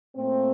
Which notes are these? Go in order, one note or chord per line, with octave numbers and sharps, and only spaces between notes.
A#2 A3 C4